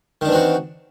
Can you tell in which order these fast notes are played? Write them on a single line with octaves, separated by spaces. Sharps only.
D#3 D4 E3 C4 F#4